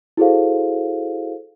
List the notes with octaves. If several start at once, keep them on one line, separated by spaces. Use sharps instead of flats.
E4 F#4 G#4 A4 C5 F5